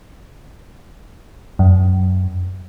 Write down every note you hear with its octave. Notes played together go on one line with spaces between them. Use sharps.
F#2